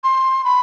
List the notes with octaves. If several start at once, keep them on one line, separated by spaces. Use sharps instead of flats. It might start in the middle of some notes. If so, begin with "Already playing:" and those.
C6
B5